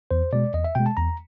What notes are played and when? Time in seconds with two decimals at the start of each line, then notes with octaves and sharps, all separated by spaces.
0.11 E2 C5
0.33 B2 G#3 D5
0.54 E2 D#5
0.64 E5
0.75 B2 G#3 G5
0.86 A5
0.97 E2 A#5